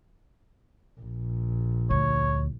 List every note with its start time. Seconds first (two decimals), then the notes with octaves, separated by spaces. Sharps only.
1.00 A#1
1.90 D2 C#5